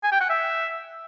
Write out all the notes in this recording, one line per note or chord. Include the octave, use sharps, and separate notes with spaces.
G#5
G5
F#5
E5